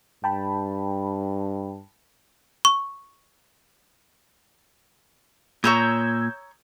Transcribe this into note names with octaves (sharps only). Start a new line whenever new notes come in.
G2 G5 A5 B5
C#6
A#2 C#5 A#5 D#6 E6 G6 G#6